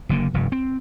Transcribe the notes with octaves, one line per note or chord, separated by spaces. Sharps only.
F#1 D3 A#3
F1 G2
C4